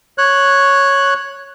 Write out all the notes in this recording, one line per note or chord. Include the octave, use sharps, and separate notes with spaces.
C#5 F#6